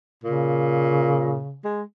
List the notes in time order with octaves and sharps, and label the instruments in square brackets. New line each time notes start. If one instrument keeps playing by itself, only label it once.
[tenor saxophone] A#2 [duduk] C#3
[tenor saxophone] G#3